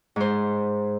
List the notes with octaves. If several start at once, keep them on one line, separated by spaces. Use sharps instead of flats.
G#2 C5